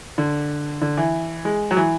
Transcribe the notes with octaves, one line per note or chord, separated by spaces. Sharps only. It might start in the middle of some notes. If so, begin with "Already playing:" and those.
D3
D3
E3
G#3
F#3
E3